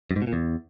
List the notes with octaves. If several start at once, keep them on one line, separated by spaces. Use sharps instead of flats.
F#2
G#2
B2
A#2
E2